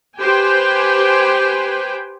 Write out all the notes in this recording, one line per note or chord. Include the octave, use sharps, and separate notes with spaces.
G4 B4 C5 G5 G#5